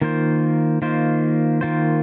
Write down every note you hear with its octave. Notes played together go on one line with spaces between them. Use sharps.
D#3 A#3 F4 C5
D#3 A#3 F4 C5
D#3 A#3 F4 C5